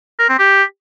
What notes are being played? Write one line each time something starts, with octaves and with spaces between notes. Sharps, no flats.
A#4
C4
G4